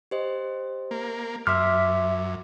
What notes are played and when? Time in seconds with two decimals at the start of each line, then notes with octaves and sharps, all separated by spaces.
0.11 G4 C5 D#5
0.91 A#3
1.47 F#2 E5 C6 D6 E6 F6